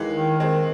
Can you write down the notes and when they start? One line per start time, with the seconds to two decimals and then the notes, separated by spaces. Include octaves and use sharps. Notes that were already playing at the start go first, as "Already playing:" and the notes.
Already playing: D#2 E3 G#3
0.16 D#3
0.39 D#2 G#3 C4